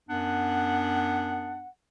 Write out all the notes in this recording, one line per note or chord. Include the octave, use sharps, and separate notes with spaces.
F#2 B3 D4 F#5